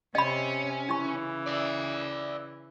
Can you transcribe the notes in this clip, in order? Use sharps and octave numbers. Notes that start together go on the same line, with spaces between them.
C3 C#4 D#5 B5
C#3 E3 D#4 E4 C#6
D5 E5